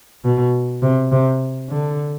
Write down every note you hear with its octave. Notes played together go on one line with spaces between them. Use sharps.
B2
C3
C3
D3